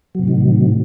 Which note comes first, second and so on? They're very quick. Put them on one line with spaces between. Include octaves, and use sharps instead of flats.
F#3 C3 A2 D#3